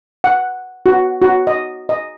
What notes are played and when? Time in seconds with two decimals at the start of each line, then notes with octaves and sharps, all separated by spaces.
0.24 F#5
0.86 F#4
1.22 F#4
1.47 D#5
1.89 D#5